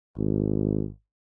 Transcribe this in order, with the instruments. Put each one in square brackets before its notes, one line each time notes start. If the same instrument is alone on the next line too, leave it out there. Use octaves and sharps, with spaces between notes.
[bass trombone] G#1